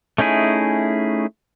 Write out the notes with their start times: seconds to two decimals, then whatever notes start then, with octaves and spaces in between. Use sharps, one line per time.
0.18 A3 C#4 D#4 E4 G#4